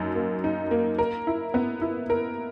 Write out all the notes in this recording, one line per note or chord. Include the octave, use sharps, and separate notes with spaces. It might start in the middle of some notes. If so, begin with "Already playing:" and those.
Already playing: F#2 D#4
A#3
D#4
A#3
A#4
E4
B3
E4
A#4